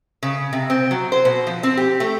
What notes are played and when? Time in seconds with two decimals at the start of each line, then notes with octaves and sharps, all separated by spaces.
0.23 C#3
0.53 C3
0.70 C4
0.91 F#3
1.12 C5
1.25 B2
1.47 F3
1.63 C4
1.77 G4
2.00 A3